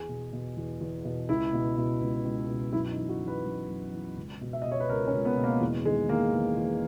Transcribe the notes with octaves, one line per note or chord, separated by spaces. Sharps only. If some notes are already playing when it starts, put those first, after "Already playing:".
Already playing: E2 G#4
B2
B2
E2
E2
B2
C#2 E4
B2
B2
C#2
C#2
B2
F#2 E4
D#4
E3
F#4
E3
B4
F#2
F#2
E3
C#2
B2
E5
B2 D#5
C#5
B4
C#2 A#4
C#4
C#2
B3
B2
A#3
E2
D#3 G#3
D#3 A#3
E2
E2